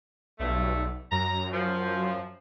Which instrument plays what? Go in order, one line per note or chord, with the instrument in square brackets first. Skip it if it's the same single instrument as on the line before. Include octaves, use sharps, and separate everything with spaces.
[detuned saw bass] B1 [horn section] G2 A3
[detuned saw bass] F#2 [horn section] A#5
[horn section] F3